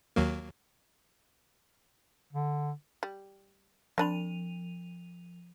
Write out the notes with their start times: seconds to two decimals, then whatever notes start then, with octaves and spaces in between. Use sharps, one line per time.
0.16 D#2 F#3 A#3
2.33 D3
3.03 G3
3.98 F3 C4 D4 B5 D#7 F7